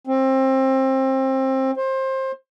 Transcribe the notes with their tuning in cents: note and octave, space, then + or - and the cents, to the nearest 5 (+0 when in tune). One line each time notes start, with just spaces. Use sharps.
C4 +25
C5 +20